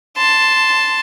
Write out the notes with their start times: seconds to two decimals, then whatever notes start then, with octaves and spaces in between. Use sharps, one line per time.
0.17 A5 C6